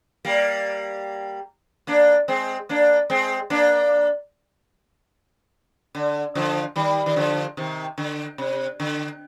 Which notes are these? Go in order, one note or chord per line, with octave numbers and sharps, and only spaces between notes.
G3 A#3
A#3 D4
G#3 C4
A#3 D4
G#3 C4
A#3 D4
D3
D3 F3
D#3 G3
D#3
D3 F3
C3 D#3
D3
C3
D3